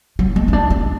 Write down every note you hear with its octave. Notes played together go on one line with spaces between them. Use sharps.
F#3
G#3
C#4
D4
C#4